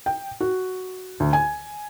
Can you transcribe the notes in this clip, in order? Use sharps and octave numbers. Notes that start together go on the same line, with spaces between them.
G5
F#4
D2
G#5